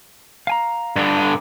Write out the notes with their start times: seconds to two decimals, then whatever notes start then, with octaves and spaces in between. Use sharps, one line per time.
0.47 F5 G#5 A#5
0.96 G2 D3